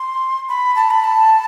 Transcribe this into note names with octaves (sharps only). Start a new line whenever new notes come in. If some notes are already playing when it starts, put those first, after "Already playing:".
Already playing: C6
B5
A5
B5
A5